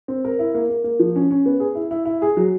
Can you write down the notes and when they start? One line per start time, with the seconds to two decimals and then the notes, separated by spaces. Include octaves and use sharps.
0.08 C4
0.25 A#4
0.39 E4
0.55 A#3
0.70 A#3
0.84 A#3
1.00 F3
1.16 C#4
1.31 C#4
1.46 B3
1.60 G#4
1.75 E4
1.91 E4
2.06 E4
2.22 G#4
2.37 F#3